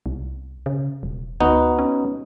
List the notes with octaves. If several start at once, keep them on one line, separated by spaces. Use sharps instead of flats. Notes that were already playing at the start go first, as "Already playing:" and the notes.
C2
C#3
E1
D2 B3 D#4 F#4
C#4